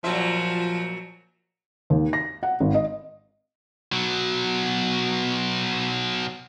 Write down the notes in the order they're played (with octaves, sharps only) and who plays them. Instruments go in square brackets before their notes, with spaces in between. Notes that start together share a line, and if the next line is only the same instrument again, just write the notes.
[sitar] A#2 F#3 E5 [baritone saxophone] F3
[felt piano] D#2
A#6
F#5
G#1
D#5
[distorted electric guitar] B2 F#3